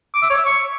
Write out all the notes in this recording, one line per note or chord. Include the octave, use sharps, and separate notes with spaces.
D6
E5
C#5
E5
C#6